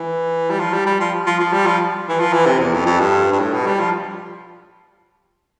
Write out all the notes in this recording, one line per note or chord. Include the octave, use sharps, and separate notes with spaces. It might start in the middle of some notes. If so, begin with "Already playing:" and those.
Already playing: E3
G3
F3
G3
G3
F3
F3
F3
G3
F3
E3
F3
E3
C3
E2
F2
F2
G2
G2
A2
B2
G3
F3